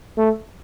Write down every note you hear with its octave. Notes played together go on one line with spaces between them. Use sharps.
A3